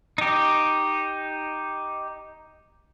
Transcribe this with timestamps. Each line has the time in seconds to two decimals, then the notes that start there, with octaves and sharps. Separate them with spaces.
0.18 D#4 G4